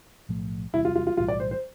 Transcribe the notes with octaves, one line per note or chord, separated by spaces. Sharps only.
B1 A2 F3 A3
E2 C3 G3 E4
F4
F4
F4
B1 A2 E3 G3 F4
D5
C5
C5